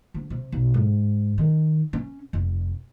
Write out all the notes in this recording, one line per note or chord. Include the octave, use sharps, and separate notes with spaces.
D2
C3
B1
G#2
D#3
C#4
F1